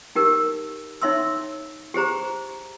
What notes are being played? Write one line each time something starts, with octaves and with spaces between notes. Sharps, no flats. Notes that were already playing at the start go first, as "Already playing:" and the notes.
D#4 G4 A#4
D#4 C#5 E5 C6 E6
G4 G#4 C5 A#5